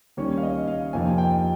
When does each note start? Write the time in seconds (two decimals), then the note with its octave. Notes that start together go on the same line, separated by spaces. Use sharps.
0.17 D#3 G3 A#3 C#4 C#5
0.38 F5
0.43 D#5
0.67 F5
0.93 F2 C3 F3 A#3 D#4 G#5
1.18 G5